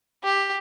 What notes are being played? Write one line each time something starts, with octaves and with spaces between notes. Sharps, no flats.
G4